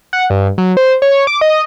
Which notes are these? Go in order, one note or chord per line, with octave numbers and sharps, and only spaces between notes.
F#5
G2
F#3
C5
C#5
D6
D#5